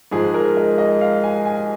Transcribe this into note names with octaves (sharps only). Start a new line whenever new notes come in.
G#2 F3 G#3 G#4
A#4
D#5
D#5
F5
G#5
G#5